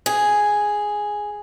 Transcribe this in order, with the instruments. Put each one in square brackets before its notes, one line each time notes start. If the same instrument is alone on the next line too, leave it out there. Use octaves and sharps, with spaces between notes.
[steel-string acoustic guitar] G#4